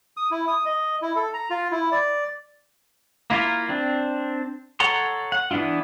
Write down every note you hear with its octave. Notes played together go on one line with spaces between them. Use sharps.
D#6
E4
D#6
D#5
E4
A4
A#5
F4
E4
D5
A#3 E4 F4 A#4
C4 D4
A4 C#5 F#5 A#5 C6
F#5
E3 B3 D4 E4 F4